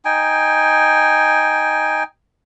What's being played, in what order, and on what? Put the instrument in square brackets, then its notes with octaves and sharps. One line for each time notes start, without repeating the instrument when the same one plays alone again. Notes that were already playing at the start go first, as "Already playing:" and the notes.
[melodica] D#4 G5 G#5